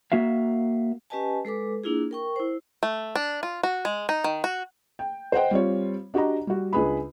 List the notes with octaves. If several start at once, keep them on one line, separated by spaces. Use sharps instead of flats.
A#3 F#4 E5 F5
C#4 G4 B4 D#5 G#5 A5
G#3 A4 B4 D6
A#3 D4 E4 F4 G#4
A#4 G5 C#6
E4 C5
A3
D4
F4
F#4
G#3
D#4
D#3
F#4
G5
C5 D#5 F#5 G5
G3 C4 F4 C#5
D4 F#4 G4 D#5 A#5
G3 F#4
C#2 D4 G#4 B4 B5